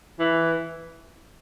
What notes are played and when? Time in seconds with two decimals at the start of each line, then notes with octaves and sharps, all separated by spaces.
0.19 E3